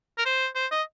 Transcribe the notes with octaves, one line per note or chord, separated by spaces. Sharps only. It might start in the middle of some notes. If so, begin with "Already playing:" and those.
A#4
C5
C5
D#5